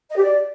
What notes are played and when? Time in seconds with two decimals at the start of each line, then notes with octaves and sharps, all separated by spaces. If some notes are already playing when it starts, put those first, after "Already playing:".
0.10 D#5
0.17 G4
0.23 D5